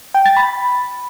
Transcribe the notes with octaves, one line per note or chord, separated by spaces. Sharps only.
G5
A6
B5